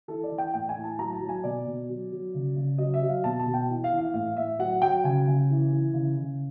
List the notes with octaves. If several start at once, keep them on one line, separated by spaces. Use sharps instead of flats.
E3 A4
D5
E3
G5
A2 G5
G#5
A2
A5
F#3 A#5
A5
F#3
G#5
B2 D5
B2
F#3
F#3
C#3
C#3
F#3 D#5
E5
F#3
F5
B2 A5
A5
B2
G5
E3
F5
E3
F5
A2 F5
A2 E5
F#3 F#5
F#3 G5
C#3 G#5
C#3
E3
E3
C#3
C#3